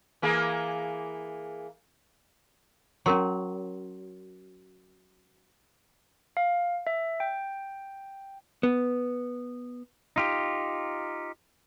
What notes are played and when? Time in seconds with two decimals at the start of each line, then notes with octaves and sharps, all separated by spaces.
0.22 E3 A#3 G#4
3.06 F#3 C#4 A#4 C6
6.37 F5
6.87 E5
7.20 G5
8.63 B3
10.16 D#4 F4 G4